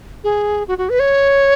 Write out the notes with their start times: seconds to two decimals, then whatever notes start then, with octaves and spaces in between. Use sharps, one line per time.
0.24 G#4
0.68 F#4
0.78 F#4
0.89 B4
0.99 C#5